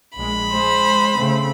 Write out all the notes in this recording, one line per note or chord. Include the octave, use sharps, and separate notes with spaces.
A#1 G#3 B5
G#3 C5
C#3 A3 C4